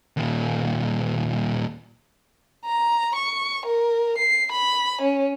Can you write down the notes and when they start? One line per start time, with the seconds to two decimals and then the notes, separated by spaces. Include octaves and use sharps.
0.17 D#2 A#2
2.66 A#5
3.16 C#6
3.66 A#4
4.18 C7
4.52 B5
5.02 C#4